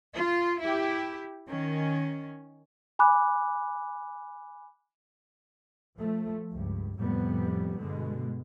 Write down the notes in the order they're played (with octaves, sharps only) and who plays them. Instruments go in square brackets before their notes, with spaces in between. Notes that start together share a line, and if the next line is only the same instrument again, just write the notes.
[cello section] F4
E4 G4
D#3 C#4
[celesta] G#5 B5 D6 F#6
[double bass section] F3 A3
C#2 G2
F2 A2 C3 G3 B3
G2 B2 D3 G#3